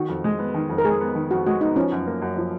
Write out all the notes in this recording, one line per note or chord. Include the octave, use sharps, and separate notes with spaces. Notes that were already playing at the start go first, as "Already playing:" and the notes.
Already playing: D#3 F#4
F2
G#3
B3
D#3
F2
A#4
G#3 G#4
B3
D#3
F2 F#4
G#3 F#4
B3 D#4
F3 C#4
F#2
A#3
F#2
F3